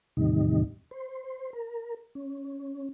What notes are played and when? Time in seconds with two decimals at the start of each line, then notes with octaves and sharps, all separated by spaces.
0.17 E2 A2 C3 D#3 G3 D#4
0.91 C5
1.53 A#4
2.15 C#4